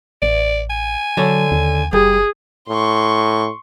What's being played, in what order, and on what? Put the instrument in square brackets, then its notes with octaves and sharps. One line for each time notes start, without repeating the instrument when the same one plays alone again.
[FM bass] A1 [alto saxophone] D5
[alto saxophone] G#5
[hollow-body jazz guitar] D3 A4 C#5 [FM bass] F#3
[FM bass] D#2
[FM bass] F#1 [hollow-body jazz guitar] G3 [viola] G#4
[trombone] A2 [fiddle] C6 C#6